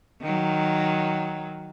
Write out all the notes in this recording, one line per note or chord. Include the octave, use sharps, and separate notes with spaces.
D#3 F#3